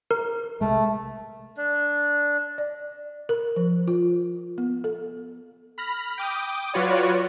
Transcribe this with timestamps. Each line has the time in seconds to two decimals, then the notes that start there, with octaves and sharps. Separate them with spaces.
0.11 A#4
0.61 B1 C3 G#3 A3
1.57 D4
2.58 D5
3.29 A#4
3.56 F3
3.87 F4
4.58 B3
4.84 A4
5.78 B5 F6 A#6
6.18 G5 D6 D#6
6.74 F#3 F4 F#4 B4 C#5 D5